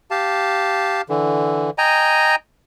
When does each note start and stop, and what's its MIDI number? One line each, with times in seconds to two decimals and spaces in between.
0.11 1.02 67
0.11 1.02 77
0.11 1.02 81
1.09 1.70 50
1.09 1.70 52
1.78 2.35 75
1.78 2.35 79
1.78 2.35 80
1.78 2.35 82